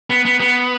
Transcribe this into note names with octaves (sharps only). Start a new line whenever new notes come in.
B3
B3
B3